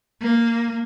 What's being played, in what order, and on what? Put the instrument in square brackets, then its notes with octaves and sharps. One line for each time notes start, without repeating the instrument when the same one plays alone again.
[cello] A#3